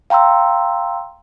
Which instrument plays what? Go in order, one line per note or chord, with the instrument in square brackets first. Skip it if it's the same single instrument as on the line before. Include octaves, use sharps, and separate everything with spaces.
[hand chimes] F5 G5 A#5 C6 E6